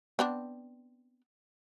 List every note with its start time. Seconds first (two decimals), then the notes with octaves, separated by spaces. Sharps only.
0.19 B3 C4 D4